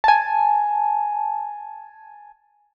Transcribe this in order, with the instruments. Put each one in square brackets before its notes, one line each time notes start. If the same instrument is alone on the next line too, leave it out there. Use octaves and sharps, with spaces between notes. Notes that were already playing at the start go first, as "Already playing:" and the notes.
[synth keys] G#5 A5